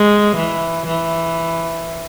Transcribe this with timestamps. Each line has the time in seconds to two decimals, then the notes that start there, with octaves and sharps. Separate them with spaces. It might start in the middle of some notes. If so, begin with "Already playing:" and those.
Already playing: G#3
0.36 E3
0.86 E3